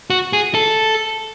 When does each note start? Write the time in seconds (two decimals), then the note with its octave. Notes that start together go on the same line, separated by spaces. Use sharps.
0.10 F#4
0.33 G#4
0.55 A4